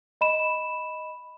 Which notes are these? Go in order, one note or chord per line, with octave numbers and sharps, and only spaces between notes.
D#5 B5 E7